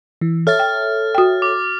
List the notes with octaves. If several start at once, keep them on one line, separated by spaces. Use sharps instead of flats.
E3
A4 C#5 E5 F6 A6
G5
F#4 G5
D6